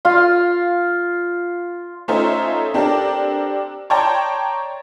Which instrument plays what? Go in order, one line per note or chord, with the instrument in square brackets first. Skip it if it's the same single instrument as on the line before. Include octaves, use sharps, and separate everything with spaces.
[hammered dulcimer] F4 F5
[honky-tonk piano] A3 C#4 D#4 F4 C5 E5
C4 D4 G4 A4 A#4
C#5 D5 G5 A5 A#5 C6